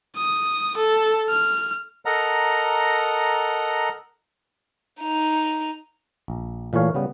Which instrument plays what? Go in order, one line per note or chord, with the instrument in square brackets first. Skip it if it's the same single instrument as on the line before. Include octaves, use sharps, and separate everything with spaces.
[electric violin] D#6
A4
F6
[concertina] A4 A#4 D#5 F#5 A#5
[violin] D#4 F7
[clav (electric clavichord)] A#1
A#2 E3 A3 C#5 F5
C#3 G3 B3